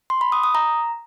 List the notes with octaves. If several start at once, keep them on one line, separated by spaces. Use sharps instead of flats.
C6
B5
D#6
D#6
A#5